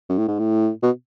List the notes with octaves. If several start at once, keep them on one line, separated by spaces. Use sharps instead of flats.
F#2
A2
G#2
A2
B2